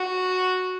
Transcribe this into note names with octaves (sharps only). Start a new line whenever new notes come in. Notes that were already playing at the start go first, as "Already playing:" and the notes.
Already playing: F#4